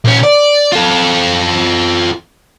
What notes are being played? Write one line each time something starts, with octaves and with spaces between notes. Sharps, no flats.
A#2 C#4
D5
F4 A4